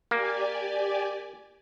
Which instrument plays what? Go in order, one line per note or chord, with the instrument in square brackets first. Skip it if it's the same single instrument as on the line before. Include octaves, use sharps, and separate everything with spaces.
[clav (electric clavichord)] A#3 [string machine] G4 D5 G#5